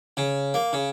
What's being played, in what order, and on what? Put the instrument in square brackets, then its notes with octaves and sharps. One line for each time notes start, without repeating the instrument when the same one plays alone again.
[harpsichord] C#3
A#3
C#3